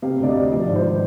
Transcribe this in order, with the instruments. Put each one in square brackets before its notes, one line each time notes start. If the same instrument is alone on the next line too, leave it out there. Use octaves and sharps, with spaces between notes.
[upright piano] C3 F5
D2 D5
D#5
D2
F3 D5
G#1
C5